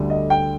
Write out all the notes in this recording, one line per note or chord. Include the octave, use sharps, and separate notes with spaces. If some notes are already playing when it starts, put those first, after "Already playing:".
Already playing: D2 D3 G3
D#5
G5